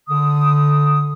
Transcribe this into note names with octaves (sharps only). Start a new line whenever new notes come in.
D3 D#6